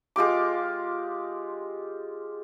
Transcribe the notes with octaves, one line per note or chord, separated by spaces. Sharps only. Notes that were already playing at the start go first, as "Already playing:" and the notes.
G#3 F4 G4 D6